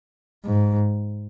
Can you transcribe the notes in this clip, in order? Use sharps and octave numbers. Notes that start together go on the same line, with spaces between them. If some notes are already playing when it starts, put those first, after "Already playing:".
G#2